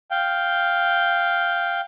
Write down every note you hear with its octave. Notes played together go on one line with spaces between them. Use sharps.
F5 G5